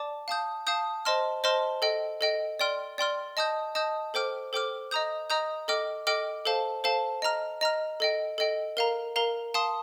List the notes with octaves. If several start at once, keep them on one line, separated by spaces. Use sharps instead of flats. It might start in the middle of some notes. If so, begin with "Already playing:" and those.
Already playing: D5 A5 D6
F5 A5 D#6 G6
F5 A5 D#6 G6
C5 D#5 A5 C6 F6
C5 D#5 A5 C6 F6
A4 D#5 G5
A4 D#5 G5
D5 G5 C6 F6
D5 G5 C6 F6
D#5 A5 D#6 G6
D#5 A5 D#6 G6
A4 C5 G5 D6 F6
A4 C5 G5 D6 F6
D#5 A#5 D#6 G6
D#5 A#5 D#6 G6
A4 D#5 G5 D6 F6
A4 D#5 G5 D6 F6
A4 C5 F5 A5
A4 C5 F5 A5
D#5 A#5 F6
D#5 A#5 F6
A4 D#5 G5
A4 D#5 G5
A#4 F5 A#5
A#4 F5 A#5
F5 A5 C6 D#6